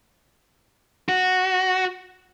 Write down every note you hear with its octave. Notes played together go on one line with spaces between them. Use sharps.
F#4